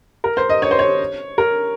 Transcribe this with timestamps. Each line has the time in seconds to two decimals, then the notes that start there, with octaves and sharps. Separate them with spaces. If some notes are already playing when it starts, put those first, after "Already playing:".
0.24 A#4
0.37 C5
0.49 D#5
0.62 C#5
0.71 C5
0.79 C#5
1.38 A#4